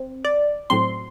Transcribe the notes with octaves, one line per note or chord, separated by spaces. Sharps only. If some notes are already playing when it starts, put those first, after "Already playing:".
Already playing: C4
D5
A2 F#3 C4 C6